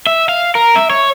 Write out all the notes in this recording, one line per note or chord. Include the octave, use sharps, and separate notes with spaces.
E5
F5
A#4
E5
C#5